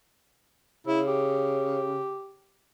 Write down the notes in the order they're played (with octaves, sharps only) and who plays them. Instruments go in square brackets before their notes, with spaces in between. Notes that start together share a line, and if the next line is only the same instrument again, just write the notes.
[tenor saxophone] C#3 [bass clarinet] E4
[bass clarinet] G4